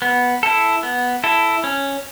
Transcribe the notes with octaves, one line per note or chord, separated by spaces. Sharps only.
B3
E4 A4
B3
E4 A4
C#4